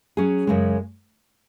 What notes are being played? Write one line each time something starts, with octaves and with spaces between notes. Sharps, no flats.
F#3 C#4 G#4
F#2 C#3 G#3